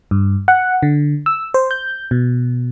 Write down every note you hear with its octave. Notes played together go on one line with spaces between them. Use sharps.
G2
F#5
D3
E6
C5
G6
B2